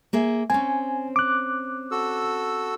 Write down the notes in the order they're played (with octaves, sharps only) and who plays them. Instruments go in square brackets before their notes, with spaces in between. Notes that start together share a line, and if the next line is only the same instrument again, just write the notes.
[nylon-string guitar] A#3 G#4 E5
[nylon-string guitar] C4 C#4 [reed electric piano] G#5
[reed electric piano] D6 F#6
[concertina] F#4 A4 E6